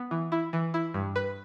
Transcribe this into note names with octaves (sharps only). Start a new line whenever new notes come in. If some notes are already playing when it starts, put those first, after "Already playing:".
Already playing: B3
E3
E4
E3
E4
G2
B4